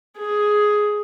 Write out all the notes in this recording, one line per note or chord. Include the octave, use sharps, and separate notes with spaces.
G#4